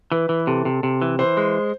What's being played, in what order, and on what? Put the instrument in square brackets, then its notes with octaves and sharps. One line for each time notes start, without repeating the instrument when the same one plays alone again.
[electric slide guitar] E3 [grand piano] B4
[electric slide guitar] E3
[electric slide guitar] C3 [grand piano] A4
[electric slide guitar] C3
C3
E3
[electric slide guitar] E3 [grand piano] C5
[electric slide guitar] G#3